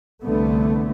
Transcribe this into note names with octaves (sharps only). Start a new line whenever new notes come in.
C2 D3 A3 B3